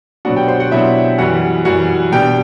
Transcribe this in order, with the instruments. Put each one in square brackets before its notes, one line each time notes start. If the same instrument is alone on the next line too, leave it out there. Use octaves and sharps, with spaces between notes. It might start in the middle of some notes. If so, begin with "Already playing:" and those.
[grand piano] B2 F#3 B3 D4 F#4 F#5
G4 G5
C5 C6
F#4 F#5
B2 F#3 B3 D4 E4 E5
F#2 E3 G3 F#4 F#5
F#2 E3 G3 F#4 F#5
B2 G3 D4 G4 G5